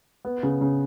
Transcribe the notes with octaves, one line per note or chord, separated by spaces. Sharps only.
B3
C#3
C#3